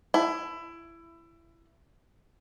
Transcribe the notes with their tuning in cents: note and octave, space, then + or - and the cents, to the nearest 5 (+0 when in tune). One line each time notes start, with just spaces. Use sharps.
E4 +20